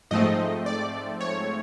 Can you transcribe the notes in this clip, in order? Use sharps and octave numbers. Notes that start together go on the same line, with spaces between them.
G#2 F3 A3 C4 D#5
D5
C#5